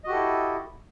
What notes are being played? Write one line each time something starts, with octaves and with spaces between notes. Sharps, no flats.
E4 F#4 G4 A4 D#5